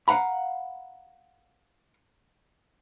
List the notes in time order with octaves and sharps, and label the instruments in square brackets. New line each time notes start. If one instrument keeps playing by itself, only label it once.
[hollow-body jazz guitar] F5 F#5 A#5 B5